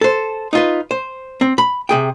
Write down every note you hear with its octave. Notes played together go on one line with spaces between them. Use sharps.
A4 C5
D#4 F4 B4
C5
C4
B5
C3 G#4 G5